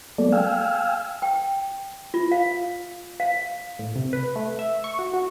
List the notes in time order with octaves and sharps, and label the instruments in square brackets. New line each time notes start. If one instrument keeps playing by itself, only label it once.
[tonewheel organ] F#3 G#3 A#3 B3 A4 D5
F5 G5 G#5 E6 F6
[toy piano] G5
F4
F5
F5
[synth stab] A2
C3
B4
A3
E5
C#6
F#4
F#4